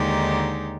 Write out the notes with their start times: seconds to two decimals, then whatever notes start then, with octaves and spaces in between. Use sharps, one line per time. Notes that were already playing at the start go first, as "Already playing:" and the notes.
Already playing: D#2 D3 G#3 D#4 G4